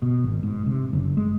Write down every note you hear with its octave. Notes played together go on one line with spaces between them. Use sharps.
B2
G#1
G#2
C3
F#1
G#3